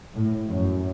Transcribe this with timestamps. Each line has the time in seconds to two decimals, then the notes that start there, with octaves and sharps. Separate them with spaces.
0.15 A2
0.49 F#2